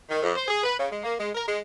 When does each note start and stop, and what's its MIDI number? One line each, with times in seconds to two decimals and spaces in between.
0.09 0.22 51
0.23 0.32 41
0.35 0.45 72
0.48 0.61 68
0.64 0.75 71
0.79 0.91 49
0.92 1.01 56
1.04 1.14 58
1.19 1.30 56
1.35 1.45 70
1.48 1.59 56